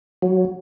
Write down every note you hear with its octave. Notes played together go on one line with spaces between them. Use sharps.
F#3